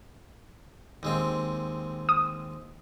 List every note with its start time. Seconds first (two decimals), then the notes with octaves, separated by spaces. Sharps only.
1.03 D#2 G#3 C4
2.09 D#6